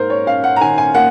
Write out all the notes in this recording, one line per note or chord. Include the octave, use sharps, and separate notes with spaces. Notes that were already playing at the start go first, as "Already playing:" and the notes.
Already playing: G#2 A#3 A#4 C5
C#5
C#4 F5
F#5
A#5
D#3 G#5
G#5
A#3 F#5